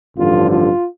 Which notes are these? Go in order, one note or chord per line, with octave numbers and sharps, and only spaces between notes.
A1 G2 D3 F3 F4
F4